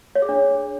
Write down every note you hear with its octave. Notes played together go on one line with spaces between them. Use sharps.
C#5
G#4
D4